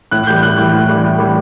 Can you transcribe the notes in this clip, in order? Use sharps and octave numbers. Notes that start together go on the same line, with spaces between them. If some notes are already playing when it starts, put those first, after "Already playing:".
A2 F#6
E3 G3 G6
A2 F#6
E3 G3
A2
E3 G3
A2
E3 G3